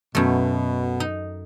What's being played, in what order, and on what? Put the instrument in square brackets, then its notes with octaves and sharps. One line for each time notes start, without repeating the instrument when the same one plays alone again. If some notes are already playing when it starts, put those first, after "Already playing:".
[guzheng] F#2 A3 [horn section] B2
[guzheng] D#4